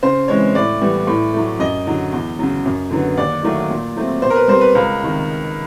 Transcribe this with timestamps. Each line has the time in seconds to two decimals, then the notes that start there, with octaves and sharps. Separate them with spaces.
0.03 C#3 C5
0.28 E3 G#3 C4 C#5
0.55 A2 D5
0.81 E3 G3 B3
1.07 A2
1.34 F#3 A3
1.59 F#2 D#5
1.87 D3 F#3
2.13 E2
2.39 C#3 F#3
2.65 F#2
2.91 D3 F#3 B3
3.17 D#2 D5
3.43 D#3 F#3 A3
3.70 A#2
3.96 F#3 A3 C4
4.22 B2 C5
4.30 A#4
4.36 B4
4.48 G3 C4 C5
4.61 B4
4.75 C#2 A#4
5.01 C3 D#3